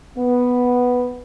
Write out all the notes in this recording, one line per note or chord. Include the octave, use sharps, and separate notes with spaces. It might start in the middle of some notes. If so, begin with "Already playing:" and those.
B3